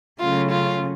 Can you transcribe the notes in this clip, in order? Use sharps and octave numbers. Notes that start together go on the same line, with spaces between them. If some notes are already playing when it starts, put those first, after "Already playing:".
C#3 F#3 A3 C#4 F4
F4